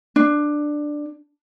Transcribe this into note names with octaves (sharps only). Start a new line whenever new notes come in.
D4